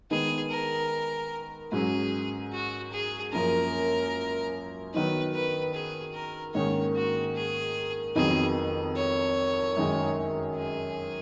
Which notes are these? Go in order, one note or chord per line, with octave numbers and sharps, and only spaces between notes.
D#3 G#3 B3 D#4 G#4
A#4
G#2 F#3 C#4 G#4
F#4
G#4
F#2 F3 A#3 C#4 A#4
D#3 F#3 B3 D#4 B4
B4
G#4
A#4
G#2 D#3 A#3 C#4 C#5
F#4
G#4
F2 D#3 F#3 B3 D#4 G#4
C#5
F#2 D#3 G#3 D#4
G#4